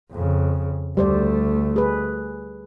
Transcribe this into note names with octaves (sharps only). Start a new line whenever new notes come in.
F2 C#3
D2 G3 A3 C5 D5
G#4 B4